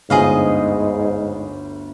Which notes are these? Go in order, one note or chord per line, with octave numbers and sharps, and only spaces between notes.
G1 D2 G#2 G#4 D#5 F5